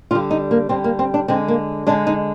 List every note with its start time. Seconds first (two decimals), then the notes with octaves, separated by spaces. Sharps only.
0.11 D3 G3 F4
0.31 D#4
0.51 A#3
0.69 D3 G3 C4
0.84 A#3
0.99 C4
1.14 D4
1.28 D3 G#3 C4
1.48 A#3
1.87 D3 G#3 D4
2.07 D#4